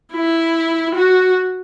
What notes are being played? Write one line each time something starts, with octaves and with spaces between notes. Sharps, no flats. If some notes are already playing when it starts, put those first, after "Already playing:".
E4
F#4